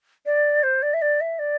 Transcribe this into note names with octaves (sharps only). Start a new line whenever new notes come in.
D5
C5
D5
E5
D5
E5
D5